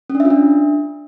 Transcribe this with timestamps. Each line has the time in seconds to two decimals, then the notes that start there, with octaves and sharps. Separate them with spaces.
0.10 C#4
0.15 D4
0.20 E5
0.25 F4
0.30 D4